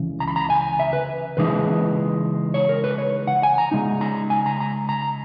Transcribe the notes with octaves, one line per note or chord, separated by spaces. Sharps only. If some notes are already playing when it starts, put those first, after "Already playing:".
Already playing: C#2 C#3 E3
A#5
B5
A#5
G#5
E5
B4
C#3 E3 G#3 D#4 B4
C#5
A#4
B4
C#5
F#5
G#5
A#5
C#3 G#3 D#4
A#5
G#5
A#5
A#5
A#5